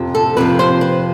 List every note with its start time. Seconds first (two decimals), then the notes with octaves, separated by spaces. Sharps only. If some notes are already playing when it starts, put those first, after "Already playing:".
Already playing: F2 C3 F3
0.15 A4
0.37 F2 C3 F3 B4
0.59 C5
0.81 B4